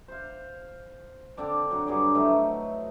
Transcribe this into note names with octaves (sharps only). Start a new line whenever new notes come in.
C5 F5
D3 C4 D4 D6
F#3 F#4
G2 F#3 G#4 D5
E3 F#3 A3 D#4